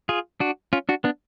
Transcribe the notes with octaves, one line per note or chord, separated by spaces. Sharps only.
F4 G#4
D4 F#4
C#4 F4
D4 F#4
B3 D4